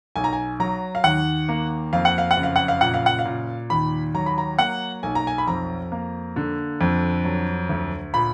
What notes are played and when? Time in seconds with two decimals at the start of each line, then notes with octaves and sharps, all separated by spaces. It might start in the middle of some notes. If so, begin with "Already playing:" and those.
0.16 B1 G#5
0.24 A#5
0.33 G#5
0.60 F#3 A#5
0.95 F5
1.04 D#2 F#5
1.49 A#3
1.93 F2 F5
2.05 F#5
2.18 F5
2.31 F#5
2.37 F#1
2.43 F5
2.56 F#5
2.68 F5
2.81 A#2 F#5
2.94 F5
3.06 F#5
3.19 F5
3.26 A#2
3.70 D#2 B5
4.15 F#3 A#5
4.26 B5
4.38 A#5
4.59 A#3 F#5
5.03 B1 G#5
5.15 A#5
5.27 G#5
5.38 B5
5.47 F2 A#5
5.92 A#3
6.36 D3
6.81 F2
7.25 F#3
7.69 D2
8.14 A#2 B5